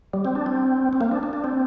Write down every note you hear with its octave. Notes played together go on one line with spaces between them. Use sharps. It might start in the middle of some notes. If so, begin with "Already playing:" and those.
G3
C4
D4
C4
C4
A#3
D4
D4
D4
C4